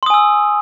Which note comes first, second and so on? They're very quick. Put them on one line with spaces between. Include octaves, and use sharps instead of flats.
C6 D#6 G#5 E6